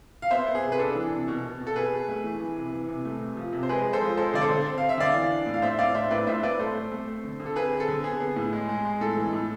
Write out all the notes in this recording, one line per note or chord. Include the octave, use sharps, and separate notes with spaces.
F5
B3 C5 E5
B3
G#4
C3
B4
D4 A4
E3
C3
B2
B2
B2
A4
B2 G#4 B4
B2
A3
E3
E3
C3
E3
C3
A3
C3
F3
C3
C5
G#3 G#4 B4
G#3
A4 C5
F3
G#3 A4 C5
D3 D5
A4 C5
D3
C4
C4 F5
E5
D3 D5 F5
E3
D4
A2
F5
A2 C5 E5
A2 D5 F5
D4 C5 E5
A2 B4 D5
A2 C5 E5
A2 B4 D5
A3 A4 C5
A3
A3
C4
D3
D3
A4
C4 G#4 B4
C4
A4
D3
B3 G#4
B3
A2
G#3
G#3
G#3
A2 A4
E3
A2